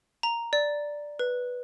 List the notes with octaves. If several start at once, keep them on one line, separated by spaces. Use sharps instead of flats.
A#5
D5
B4